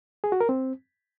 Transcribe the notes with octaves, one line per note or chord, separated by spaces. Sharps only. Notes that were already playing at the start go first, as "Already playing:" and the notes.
G#4
F#4
A#4
C4